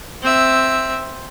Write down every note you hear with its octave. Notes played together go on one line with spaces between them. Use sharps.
C4 E5